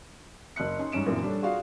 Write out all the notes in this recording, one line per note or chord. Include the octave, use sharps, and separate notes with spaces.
F#1 C6 F#6 C#7
C#4 D#4 C6
G#2 G3 C#4 D7 E7
F#2 A#2 E3 A#3 C4 D4
G3 D4 A4 C#5
F4 F#4 G#4 D5 F5